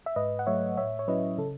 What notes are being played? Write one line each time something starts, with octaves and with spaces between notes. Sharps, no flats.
E5
G#2 B4 D#5
F#5
F#3 A3 C#5 E5
A2 C#5 E5
C#5
F#3 C#4 E4 B4 D#5
C#3 A4